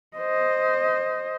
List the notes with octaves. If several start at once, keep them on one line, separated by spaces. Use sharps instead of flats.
C5 D#5